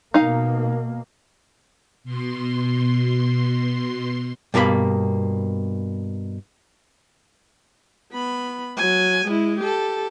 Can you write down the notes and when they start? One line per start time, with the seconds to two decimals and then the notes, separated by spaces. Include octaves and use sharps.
0.14 B2 A#3 D#4 F5
2.04 B2 C6
4.54 G2 B2 A#3 A4 B5
8.13 B3 B5
8.77 F#3 G#5
9.27 G#3 E4
9.60 G4 A4